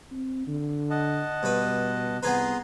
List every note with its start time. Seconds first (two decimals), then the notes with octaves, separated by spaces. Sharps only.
0.11 C4
0.47 D3
0.90 D#5 F#5 A5
1.43 G2 B2 B4
2.23 C2 B3 G#4 B4 A#5 C6